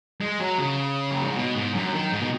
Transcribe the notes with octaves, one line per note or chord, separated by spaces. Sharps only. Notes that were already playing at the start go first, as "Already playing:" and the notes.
G#3
F#3
C#3
F#2
G#2
B2
G#2
F#2
D#3
G#2
B2